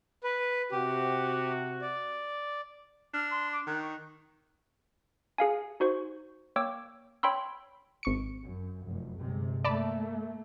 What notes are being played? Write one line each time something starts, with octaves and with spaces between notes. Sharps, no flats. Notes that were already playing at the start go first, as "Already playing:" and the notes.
B4
C3 F#4 G4
D5
D4 F6
C6
D6
D#3 F#6
C#6
G#4 F5 G#5
D#4 F#4 C5 C#6
A#3 C#5 G5 D6 E6
C#5 G5 B5 C6 E6
G#1 C#6 C#7
F#2
F1 F#2
G1 C3 G#3
A3 A#3 D5 A5 B5